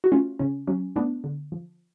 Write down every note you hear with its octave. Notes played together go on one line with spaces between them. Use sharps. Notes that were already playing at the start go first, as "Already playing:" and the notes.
F#4
A3 C#4 F4
C#3 C#4
F#3 C#4
A3 B3 D4
D3
F3